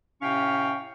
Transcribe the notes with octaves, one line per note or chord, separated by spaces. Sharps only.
A2 C3 C#4 F5 G5 C#6